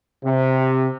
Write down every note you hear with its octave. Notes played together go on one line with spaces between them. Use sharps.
C3